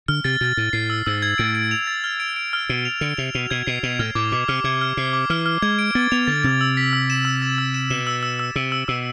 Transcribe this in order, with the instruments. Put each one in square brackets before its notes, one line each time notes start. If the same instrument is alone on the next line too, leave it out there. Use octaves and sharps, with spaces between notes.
[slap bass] D3 [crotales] F6
[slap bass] C3 [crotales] A6
[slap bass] B2 [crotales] A6
[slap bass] A2 [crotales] A6
[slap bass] A2 [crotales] C7
[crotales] E6
[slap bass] G#2 [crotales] E6
[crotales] G#6
[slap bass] A2 [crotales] D7
[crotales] D7
F7
A6
F6
D7
D7
F6
[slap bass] B2 [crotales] D7
[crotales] F7
[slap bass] D3 [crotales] D7
[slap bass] C3 [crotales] F7
[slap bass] B2 [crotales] F7
[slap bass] B2 [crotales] G#6
[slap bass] B2 [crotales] C7
[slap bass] B2 [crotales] F7
[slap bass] A2 [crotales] F6
[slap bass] A2 [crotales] D6
[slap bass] B2 [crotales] D6
[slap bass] C3 [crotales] F6
[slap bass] C3 [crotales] G#6
[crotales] F6
[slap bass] C3 [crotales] C7
[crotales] D6
[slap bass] E3 [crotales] F6
[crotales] F6
[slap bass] G#3 [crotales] G#6
[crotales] D7
[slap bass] B3 [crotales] A6
[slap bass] B3 [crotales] F7
[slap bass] D3 [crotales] A6
[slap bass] C3 [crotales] A6
[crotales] E6
B6
E6
E7
E6
A6
E6
E7
[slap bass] B2 [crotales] E7
[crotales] E6
E6
E6
[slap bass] C3 [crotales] E6
[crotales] E6
[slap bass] B2 [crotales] E6